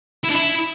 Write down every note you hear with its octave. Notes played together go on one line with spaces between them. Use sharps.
E4
D4
E4